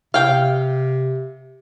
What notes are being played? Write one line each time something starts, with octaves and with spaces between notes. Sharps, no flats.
C3 F5 G5